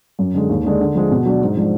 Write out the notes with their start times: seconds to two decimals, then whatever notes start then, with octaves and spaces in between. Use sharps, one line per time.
0.19 F#2
0.34 D3 G#3
0.49 D#2
0.65 D3 G#3 D4
0.80 D3
0.95 F3 G#3
1.11 B2
1.26 F#3 D4
1.41 G#2
1.57 F3 G#3 D4